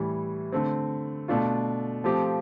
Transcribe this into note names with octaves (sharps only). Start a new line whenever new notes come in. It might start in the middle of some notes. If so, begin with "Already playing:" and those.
Already playing: A2 E3 G3
D3 A3 C4
B2 A3 D4 F4
F3 A3 C4 G4